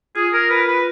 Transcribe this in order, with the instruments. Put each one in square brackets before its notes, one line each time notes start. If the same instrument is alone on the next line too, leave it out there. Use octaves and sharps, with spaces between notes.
[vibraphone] F4 [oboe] G#4
[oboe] A#4
B4
B4